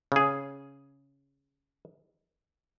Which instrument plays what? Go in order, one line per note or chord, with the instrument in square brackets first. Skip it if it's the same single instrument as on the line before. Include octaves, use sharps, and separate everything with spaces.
[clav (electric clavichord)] C#3 G#4